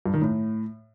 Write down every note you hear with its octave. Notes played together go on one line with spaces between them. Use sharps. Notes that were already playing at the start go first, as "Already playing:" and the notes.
G2
D#3
A2